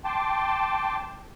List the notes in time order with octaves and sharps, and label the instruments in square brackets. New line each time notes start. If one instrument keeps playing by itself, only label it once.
[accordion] G5 A5 C6 D6